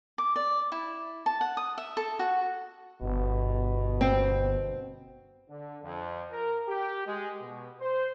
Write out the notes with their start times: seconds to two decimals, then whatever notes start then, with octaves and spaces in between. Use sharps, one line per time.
0.18 D6
0.36 D5
0.72 E4
1.26 A5
1.41 F#5
1.57 D#6
1.78 E5
1.97 A4
2.19 F#4
3.01 G1 B2
4.01 C4
5.49 D3
5.83 F2
6.32 A#4
6.68 G4
7.07 G#3
7.41 B2
7.80 C5